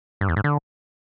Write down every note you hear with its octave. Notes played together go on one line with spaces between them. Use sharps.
G2
E2
G#2
D3